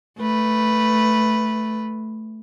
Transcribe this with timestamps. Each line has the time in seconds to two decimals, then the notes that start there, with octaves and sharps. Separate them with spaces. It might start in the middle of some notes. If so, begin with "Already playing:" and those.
0.19 A3 B4